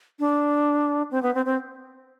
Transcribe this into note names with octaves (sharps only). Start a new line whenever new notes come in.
D4
C4
B3
C4
C4